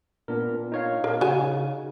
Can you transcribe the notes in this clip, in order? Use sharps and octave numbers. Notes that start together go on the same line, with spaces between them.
A#2 B3 D4 A#4
D#4 C#5 F5
D4 A#4
C#3 F#4 G#5